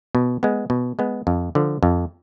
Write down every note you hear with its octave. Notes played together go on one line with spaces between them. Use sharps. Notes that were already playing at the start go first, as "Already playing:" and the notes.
B2
G#3 B3
B2
G#3 B3
F2
D3 F3
F2